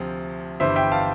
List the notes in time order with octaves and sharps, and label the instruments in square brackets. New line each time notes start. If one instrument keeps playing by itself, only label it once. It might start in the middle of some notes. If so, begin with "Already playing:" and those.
Already playing: [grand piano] D2 C3 F3 C4
G1 G2 E3 C5 E5
E5 G5
F5 A5